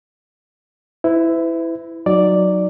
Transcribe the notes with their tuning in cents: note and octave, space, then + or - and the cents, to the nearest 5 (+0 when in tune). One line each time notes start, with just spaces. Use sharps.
E4 +0 B4 +40
F#3 +0 D#4 +0 D5 +0